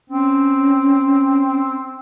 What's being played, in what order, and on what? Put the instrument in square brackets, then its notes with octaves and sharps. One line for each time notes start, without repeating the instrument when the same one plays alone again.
[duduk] C4 [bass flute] C#4